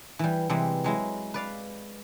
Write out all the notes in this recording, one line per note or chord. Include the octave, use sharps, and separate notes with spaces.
E3 G3
C3 E3 G3 G#3
F#3 G#3 E4
B4 D5 F5